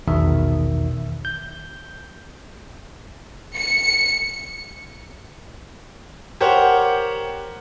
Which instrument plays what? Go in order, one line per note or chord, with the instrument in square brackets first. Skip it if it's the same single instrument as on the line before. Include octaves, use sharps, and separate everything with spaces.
[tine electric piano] A#1 E2 B2 D#3 E5
G6
[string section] C#7
[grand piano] G4 A#4 C5 C#5 F#5